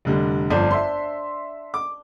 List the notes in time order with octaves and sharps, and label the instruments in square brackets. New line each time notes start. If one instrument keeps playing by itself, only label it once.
[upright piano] F1 D3 G3
[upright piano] G1 F2 [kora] D4 C5
[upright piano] E5 C6
D6